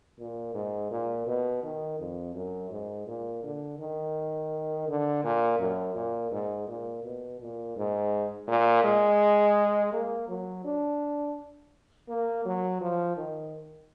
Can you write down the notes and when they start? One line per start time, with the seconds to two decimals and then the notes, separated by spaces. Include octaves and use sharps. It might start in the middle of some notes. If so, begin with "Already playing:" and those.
0.19 A#2
0.54 G#2
0.91 A#2
1.27 B2
1.63 D#3
2.00 F2
2.35 F#2
2.71 G#2
3.07 A#2
3.44 D3
3.79 D#3
4.88 D3
5.24 A#2
5.59 F#2
5.95 A#2
6.31 G#2
6.68 A#2
7.03 B2
7.40 A#2
7.77 G#2
8.48 A#2
8.84 G#3
9.93 A#3
10.28 F#3
10.64 D4
12.09 A#3
12.45 F#3
12.81 F3
13.17 D#3